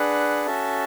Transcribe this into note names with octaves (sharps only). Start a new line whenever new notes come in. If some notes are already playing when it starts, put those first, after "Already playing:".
Already playing: D4 G#4 B4 F#5
C#4 F#4 A4 E5 A5